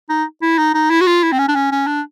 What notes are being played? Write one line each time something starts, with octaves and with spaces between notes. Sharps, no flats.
D#4
E4
D#4
D#4
E4
F#4
F4
E4
C4
C#4
D4
C#4
C#4
D4